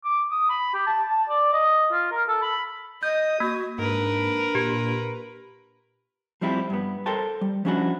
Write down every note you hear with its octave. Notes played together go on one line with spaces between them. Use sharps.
D6
D#6
B5
G4
A5
A5
D5
D#5
F4
A#4
A4
B5
D#5 D#6 G6
A#3 F#4
G#2 D4 A#4 B4
A#2 G4
F3 G3 C4 E4 G4
G2 B3
A4 A#4 C5 G5 A5
G3
F3 C#4 D4 E4 F#4 F#5